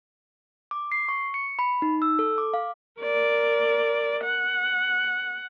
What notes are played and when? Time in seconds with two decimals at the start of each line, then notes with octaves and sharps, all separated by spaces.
0.71 D6
0.92 C7
1.09 C#6
1.34 C#7
1.59 B5
1.82 D#4
2.02 E6
2.19 A4
2.38 D6
2.54 F5
3.00 A#4 D5
4.24 F#5